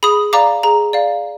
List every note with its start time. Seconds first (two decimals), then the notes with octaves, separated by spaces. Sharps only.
0.03 G#4 B5 D#6
0.33 D5 F5 A#5 D6
0.63 G#4 A#5
0.93 D5 F5